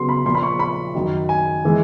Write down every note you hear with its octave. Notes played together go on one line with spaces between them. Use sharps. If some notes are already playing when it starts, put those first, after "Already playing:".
Already playing: C#3 F#3 B3 C6
B5
A#2 F3 A#3 C6
B5
C#6
B5
F#2 D#3 F#3
G#5
E3 G#3